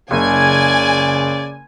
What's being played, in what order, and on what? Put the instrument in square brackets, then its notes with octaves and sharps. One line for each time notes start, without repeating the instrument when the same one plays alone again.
[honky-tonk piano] F#1 [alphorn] C#3 [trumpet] D5 [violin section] G#5